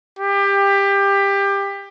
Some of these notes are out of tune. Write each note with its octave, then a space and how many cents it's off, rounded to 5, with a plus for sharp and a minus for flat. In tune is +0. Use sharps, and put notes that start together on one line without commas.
G4 +20